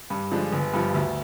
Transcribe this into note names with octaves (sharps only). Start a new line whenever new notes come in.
G2
D3 F3 G#3 D4
G1
G2 F3
D2